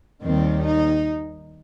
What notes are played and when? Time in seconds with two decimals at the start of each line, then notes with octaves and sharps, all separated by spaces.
0.22 D#2 D#3 G3 C4
0.65 D#4